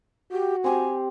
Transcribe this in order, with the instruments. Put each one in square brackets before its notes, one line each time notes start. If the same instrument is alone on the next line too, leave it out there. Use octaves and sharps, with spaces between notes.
[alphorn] F#4 [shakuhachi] G4
[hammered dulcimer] C4 G4 [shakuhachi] G#5